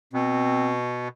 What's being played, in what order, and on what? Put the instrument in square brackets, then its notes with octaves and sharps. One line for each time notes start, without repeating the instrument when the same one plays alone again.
[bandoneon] B2 [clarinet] C4